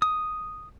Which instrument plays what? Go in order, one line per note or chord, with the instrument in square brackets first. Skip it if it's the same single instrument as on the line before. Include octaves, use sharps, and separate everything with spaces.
[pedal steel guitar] D#6